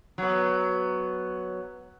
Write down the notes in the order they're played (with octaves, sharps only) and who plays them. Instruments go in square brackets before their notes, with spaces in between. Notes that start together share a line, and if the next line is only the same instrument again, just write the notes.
[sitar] F#3 B3